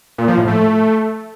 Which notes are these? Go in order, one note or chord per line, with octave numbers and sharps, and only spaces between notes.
A#2
F3
A2
A3